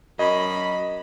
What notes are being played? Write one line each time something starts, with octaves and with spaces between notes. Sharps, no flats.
F#2 D#5 B5